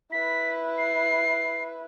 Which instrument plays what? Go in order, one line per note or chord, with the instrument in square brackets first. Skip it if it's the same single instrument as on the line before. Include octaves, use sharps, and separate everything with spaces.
[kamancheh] E4 B4 [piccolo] B6
[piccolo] C7